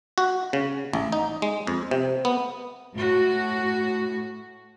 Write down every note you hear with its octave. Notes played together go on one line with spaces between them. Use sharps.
F#4
C#3
A1
D#4
G#3
F2
C3
B3
A2 F#4